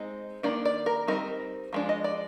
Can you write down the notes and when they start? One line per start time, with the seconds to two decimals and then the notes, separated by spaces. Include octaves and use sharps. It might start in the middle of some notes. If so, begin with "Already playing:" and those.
Already playing: G#3 C4 D#4
0.43 D#3 A#3 D4 D5
0.65 D5
0.86 A#4
1.07 G3 C4 D#4 A#4
1.73 F3 G#3 D4
1.89 D#5
2.04 D5